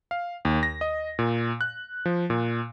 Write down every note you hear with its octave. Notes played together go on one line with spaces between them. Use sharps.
F5
D#2
A#6
D#5
A#2
F#6
F3
A#2